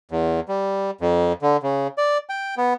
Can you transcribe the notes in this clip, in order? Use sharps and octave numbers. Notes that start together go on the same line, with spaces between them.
E2
G3
F2
D3
C#3
D5
G5
B3